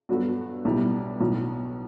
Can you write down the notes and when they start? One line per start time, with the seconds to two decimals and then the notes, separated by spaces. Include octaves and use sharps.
0.09 G2 F#3 B3 F#4 A4
0.65 B1 A2 G3 B3 E4
1.21 B1 A2 F#3 B3